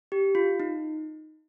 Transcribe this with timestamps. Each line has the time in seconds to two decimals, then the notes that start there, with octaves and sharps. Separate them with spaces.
0.12 G4
0.35 F4
0.60 D#4